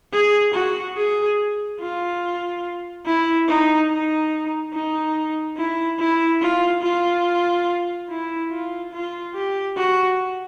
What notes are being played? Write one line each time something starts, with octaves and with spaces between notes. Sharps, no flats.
G#4
F#4
G#4
F4
E4
D#4
D#4
D#4
E4
E4
F4
F4
E4
F4
F4
G4
F#4